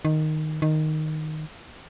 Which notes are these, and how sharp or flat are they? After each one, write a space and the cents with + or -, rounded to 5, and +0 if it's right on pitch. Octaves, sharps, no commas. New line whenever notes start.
D#3 -5
D#3 -5